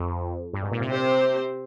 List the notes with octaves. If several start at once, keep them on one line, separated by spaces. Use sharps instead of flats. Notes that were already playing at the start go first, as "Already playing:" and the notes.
Already playing: F2
G2
G#2
A#2
C3
C4 G4 C5